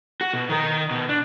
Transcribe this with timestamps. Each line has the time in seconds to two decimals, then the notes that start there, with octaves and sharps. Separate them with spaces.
0.21 F#4
0.34 B2
0.49 D#3 A#4
0.91 B2
1.09 D4